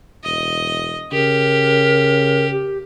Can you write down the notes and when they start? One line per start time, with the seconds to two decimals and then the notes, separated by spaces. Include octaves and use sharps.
0.24 E1 D#5
1.12 C#3 G4 A#4
2.51 G4